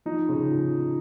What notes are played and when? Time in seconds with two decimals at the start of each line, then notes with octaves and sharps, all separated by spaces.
0.05 F3 D#4
0.29 C#3
0.50 F3
0.72 F3